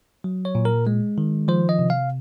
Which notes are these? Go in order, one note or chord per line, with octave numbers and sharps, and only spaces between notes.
F#3
C#5
A#2
A#4
G#3
D#3
F3 C5
D#5
C3
F5